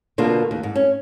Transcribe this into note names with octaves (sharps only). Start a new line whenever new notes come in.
B2 D3 A#3 F4
D#2
G#2
C#4